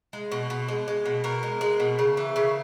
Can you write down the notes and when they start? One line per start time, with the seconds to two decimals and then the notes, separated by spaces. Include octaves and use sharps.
0.13 G#3
0.32 B2
0.50 B2
0.68 G#3
0.88 G#3
1.05 B2
1.24 B2 A#4
1.43 G#3
1.61 G#3
1.80 B2
1.99 C#3
2.17 E3
2.36 C#3